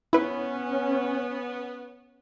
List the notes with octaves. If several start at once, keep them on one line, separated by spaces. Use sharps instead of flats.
B3 C#4 E4 B4